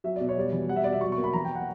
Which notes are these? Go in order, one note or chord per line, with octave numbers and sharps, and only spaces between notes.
F#3 E5
B2 D5
C#5
G3 D5
E3
G3 F#5
E5
B2 D5
E5
F#3 C#6
C#6
A#3
B5
E3 A#5
G5
F#5